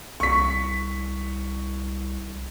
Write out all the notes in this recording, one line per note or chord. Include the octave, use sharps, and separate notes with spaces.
C2 C#6 B6